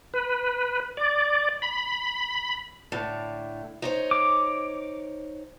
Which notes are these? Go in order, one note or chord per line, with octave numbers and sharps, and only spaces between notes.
B4
D5
B5
A2 D3
D#4 C5 C#5
D6